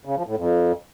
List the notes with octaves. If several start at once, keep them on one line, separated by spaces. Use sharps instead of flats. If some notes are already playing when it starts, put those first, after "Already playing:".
C#3
F3
A2
F2